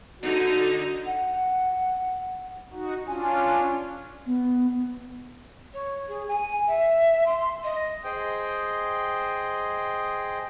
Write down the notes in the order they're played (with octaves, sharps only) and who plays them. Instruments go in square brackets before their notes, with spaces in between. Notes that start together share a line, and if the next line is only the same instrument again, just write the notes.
[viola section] D3 D#4 [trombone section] F#4
[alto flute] F#5
[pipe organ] D#4 F#4
[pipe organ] C#4 D4 F4 [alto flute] G#5
[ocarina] B3
[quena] C#5
G#4
G#5
E5
C6
D#5
[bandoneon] G#4 C5 D#5 G5